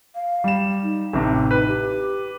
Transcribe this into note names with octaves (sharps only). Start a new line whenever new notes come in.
F5
G3 E7
D#4
A1 C3
D#4 B4
G4